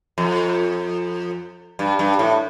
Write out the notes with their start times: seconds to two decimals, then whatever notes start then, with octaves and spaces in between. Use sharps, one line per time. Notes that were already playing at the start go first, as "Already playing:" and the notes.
0.18 F2
1.79 G2
1.99 G2
2.19 A2